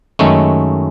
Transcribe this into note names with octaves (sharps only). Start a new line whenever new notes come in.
F#2 D#3 G#3 A3 C#4